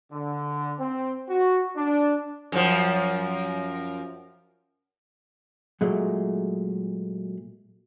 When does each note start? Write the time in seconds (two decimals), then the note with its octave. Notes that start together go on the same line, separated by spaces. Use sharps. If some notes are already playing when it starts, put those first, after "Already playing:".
0.12 D3
0.80 C4
1.29 F#4
1.76 D4
2.52 F#2 F3
5.81 A#2 F#3 G#3 A3